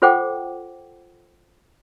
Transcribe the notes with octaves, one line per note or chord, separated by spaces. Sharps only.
F4 A4 C5 F#5 G5 D6